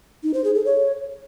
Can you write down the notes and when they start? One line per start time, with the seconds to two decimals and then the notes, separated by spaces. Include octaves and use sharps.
0.23 D#4
0.34 C5
0.44 G#4
0.55 A4
0.65 C#5